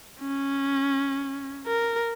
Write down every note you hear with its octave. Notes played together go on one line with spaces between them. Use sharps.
C#4
A#4